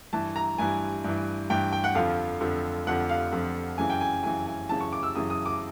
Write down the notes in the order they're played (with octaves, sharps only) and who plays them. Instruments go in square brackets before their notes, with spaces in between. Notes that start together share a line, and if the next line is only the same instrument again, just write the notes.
[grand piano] G2 E3 A5
A#5
G2 E3 G#5
G2 E3
G2 E3 G5
G5
F#5
F2 D3 F3 F5
F2 D3 F3
F2 D3 F3 F#5
F5
F2 D3 F3
F#2 C#3 E3 G#5
G5
G#5
F#2 C#3 E3 G#5
G#5
F#2 C#3 E3 A5
C#6
D6
E6
F#2 C#3 E3 D#6
D#6
D6